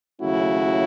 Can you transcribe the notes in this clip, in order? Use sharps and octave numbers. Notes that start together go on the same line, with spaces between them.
D#2 C#3 F#3 A3 C#4 E4 F#4